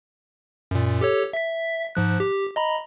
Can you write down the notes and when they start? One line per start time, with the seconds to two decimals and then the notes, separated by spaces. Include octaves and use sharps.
0.71 F#2 A#2
1.01 G4 A4 C#5
1.33 E5 B6
1.95 G#2 F3 F#6
2.20 G4
2.56 D#5 A#5 B5